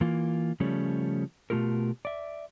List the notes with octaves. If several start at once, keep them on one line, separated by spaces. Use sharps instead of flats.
E3 A#3 F4
C#3 F3 G3 A3 C#4
B2 A3 F4 G4 A#4
D5 E5